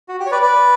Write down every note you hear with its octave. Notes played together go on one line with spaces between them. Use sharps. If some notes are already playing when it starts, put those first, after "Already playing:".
F#4
G4
C#5
B4 D5
B4 D5